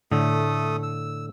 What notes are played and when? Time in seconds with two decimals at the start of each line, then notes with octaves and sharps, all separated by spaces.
0.12 A2 D3 A3 A4 D#6
0.83 E6